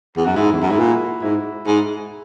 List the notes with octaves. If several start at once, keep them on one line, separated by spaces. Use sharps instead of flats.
E2
F#2 F#4
G#2 E4
E2
F#2
G#2 E4
A#2 F#4
G#2 E4
G#2